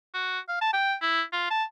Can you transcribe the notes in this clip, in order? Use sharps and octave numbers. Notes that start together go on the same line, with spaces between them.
F#4
F5
A5
G5
E4
F4
A5